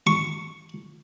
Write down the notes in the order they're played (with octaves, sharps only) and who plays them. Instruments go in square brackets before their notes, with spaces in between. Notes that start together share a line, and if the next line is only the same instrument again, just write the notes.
[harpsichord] C#6